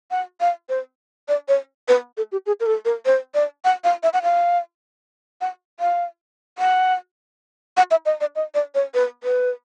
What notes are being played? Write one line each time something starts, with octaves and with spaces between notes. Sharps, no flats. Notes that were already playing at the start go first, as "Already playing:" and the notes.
F#5
F5
C5
D5
C#5
B4
A4
G4
G#4
A#4
A4
A#4
C5
D5
F#5
F5
E5
F#5
F5
F#5
F5
F#5
F#5
E5
D#5
D5
D#5
D5
C#5
B4
B4